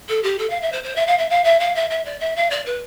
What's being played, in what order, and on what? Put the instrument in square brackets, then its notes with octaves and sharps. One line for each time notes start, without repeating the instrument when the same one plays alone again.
[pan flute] A4
G4
A4
F5
E5
C5
C5
E5
F5
E5
F5
E5
F5
E5
E5
D5
E5
F5
D5
B4